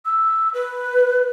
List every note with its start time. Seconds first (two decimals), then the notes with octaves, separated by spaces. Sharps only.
0.05 E6
0.54 B4